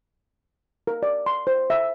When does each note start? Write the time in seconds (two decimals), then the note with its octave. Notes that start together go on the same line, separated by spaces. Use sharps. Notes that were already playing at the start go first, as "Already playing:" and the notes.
0.87 A#4
1.03 D5
1.26 C6
1.47 C5
1.70 E5